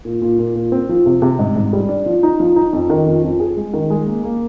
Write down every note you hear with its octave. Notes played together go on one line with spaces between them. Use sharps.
A#2
A#2
A#2
A#2
C4
F3
C3
C3
G#2
G#2
G3
D4
F3
D#4
F3
D#4
F2
D#3
F2
F2
G#4
G#3
D#3
G#3
A#3
A#3